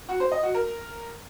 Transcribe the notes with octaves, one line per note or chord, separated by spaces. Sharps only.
F#4
C5
D#5
F#4
A#4